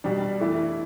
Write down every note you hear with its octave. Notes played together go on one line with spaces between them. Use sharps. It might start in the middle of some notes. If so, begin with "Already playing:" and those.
B2 G3 D4
E3 A3 E4